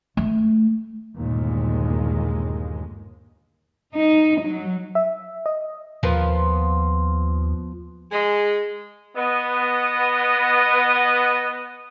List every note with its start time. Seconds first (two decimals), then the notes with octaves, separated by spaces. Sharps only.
0.17 A3
1.15 G1 D#2 A#2 G#3
3.95 D#4
4.41 F#3
4.95 E5
5.46 D#5
6.03 D#2 F3 B3 A#4
8.12 G#3
9.16 B3 D#5